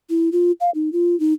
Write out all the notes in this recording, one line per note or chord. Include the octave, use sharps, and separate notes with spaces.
E4
F4
F5
D#4
F4
D#4